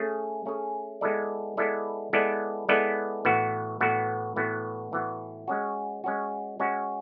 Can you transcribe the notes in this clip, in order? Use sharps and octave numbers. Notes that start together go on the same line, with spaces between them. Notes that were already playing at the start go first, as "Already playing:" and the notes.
Already playing: A3 C#4 G#4
A3 C#4 G#4
G#3 B3 E4 A4 D5
G#3 B3 E4 A4 D5
G#3 B3 E4 A4 D5
G#3 B3 E4 A4 D5
A2 E3 B3 F#4
A2 E3 B3 F#4
A2 E3 B3 F#4
A2 E3 B3 F#4
G#3 C#4 F#4
G#3 C#4 F#4
G#3 C#4 F#4